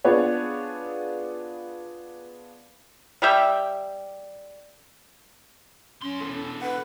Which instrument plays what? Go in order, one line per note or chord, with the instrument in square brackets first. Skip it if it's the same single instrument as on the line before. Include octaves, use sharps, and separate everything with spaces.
[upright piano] B3 D4 F4 G#4 B4 C#5
[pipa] G3 G4 E5 G5
[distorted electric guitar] F#2 C6 [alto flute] C#4
[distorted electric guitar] B2 E3 [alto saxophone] A4
[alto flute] A4 [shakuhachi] B4 [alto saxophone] F#5